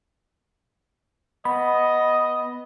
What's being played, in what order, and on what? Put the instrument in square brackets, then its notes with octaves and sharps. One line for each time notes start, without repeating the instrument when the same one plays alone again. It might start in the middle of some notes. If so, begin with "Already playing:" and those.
[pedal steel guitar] B3 [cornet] D#5 [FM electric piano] B5